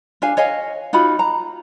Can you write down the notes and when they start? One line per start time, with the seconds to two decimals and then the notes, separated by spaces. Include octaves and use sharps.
0.22 D4 G4 F5 G#5
0.37 C#5 D#5 F5 G#5
0.93 D#4 F4 F#4 B5
1.19 A#5